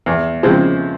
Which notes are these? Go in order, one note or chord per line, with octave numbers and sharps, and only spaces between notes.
E2
C#3 F3 G#3 C4